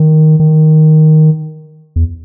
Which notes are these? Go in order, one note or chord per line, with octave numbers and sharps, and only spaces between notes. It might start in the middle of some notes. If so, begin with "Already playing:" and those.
Already playing: D#3
D#3
E2